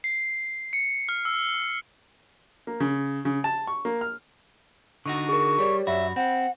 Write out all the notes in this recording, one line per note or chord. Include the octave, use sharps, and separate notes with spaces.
C7
C#7
F6
E6
A#3
C#3
C#3
A5
C#6
A#3
F6
D3 D#4 F#4 C#6
G#4 A#4 C#6
G3 G4 C#5 D5
F#2 F#4 E5 B5
C4 F#5